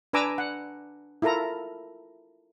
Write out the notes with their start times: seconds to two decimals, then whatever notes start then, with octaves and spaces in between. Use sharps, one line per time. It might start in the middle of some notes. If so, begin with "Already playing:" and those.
0.13 D4 B4 G#5 A#5 D6 E6
0.38 F#5
1.22 E4 F4 A4 A#4 A#5